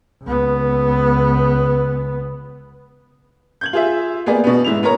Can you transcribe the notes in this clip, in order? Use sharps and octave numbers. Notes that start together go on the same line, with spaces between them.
C#2 B3
G6 G#6 F#7
F4 G#4 E5
A#3 B3 G4 G#4 D5
B2 B3
G#2 E4 F7
B3 A#4 C#5 A#5